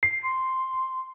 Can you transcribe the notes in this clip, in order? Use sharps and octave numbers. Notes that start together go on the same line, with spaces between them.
C7
C6